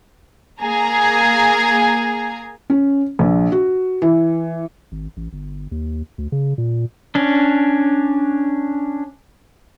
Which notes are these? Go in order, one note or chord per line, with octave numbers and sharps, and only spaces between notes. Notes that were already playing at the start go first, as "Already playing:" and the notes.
A#3 G#4 G#5 A#5
C#4
A#1
F#4
E3
G#1
A1
G1
D#2
D2
C#3
A#2
C#4 D4